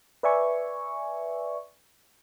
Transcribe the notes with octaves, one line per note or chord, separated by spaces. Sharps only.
B4 D5 E5 G#5 C#6